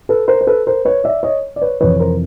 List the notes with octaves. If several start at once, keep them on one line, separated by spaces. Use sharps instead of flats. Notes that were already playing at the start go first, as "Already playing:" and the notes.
A4 B4
A#4 C5
C5
A4 B4
A#4 C5
B4 C#5
D5 E5
C#5 D#5
D5
B4 C#5
F2 C3 E3 B4 C#5
A#4 C5